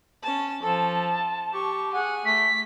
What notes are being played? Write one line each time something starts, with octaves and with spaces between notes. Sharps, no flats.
C#4 A5
F3 A4 A5
G4 C#6
G#4 F#5 G#5
A3 B6